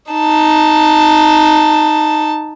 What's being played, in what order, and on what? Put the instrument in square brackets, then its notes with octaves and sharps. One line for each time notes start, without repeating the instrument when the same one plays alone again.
[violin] D#4 A5